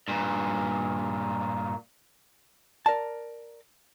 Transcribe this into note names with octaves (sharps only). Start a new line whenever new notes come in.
G2 A#2
A#4 D5 A5